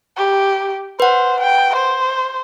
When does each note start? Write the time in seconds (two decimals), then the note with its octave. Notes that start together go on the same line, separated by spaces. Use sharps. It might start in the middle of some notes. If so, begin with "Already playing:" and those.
0.17 G4
1.00 B4 C5 F#5
1.40 G5
1.76 C5